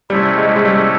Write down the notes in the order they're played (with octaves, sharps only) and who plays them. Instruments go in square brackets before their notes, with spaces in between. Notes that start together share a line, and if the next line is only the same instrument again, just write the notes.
[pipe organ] C3 F3 A3 C#4 E4 [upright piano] G3
[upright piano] G#3
G#3
G3